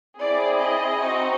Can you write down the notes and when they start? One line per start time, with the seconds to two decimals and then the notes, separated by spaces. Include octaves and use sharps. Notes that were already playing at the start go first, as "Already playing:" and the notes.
0.20 C4 E4 G#4 D5
0.60 D#5
1.00 C4 D#4 F#4